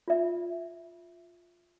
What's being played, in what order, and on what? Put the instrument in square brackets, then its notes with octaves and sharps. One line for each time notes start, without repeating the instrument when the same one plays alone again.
[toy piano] F4 E5